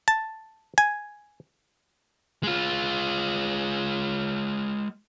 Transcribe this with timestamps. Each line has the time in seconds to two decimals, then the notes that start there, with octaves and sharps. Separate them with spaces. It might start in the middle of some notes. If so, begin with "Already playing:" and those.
0.08 A5
0.78 G#5
2.43 G#3 F4